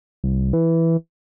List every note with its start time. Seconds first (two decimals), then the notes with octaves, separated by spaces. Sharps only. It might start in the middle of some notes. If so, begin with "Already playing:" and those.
0.24 C2
0.53 E3